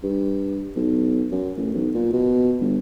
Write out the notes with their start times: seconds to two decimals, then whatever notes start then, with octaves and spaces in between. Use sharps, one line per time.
0.03 G2
0.76 B1
1.31 F#2
1.57 A1
1.74 B1
1.94 A#2
2.13 B2
2.61 G1